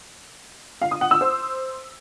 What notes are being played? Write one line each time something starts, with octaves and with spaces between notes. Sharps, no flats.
F5
D#6
F#5
E6
C5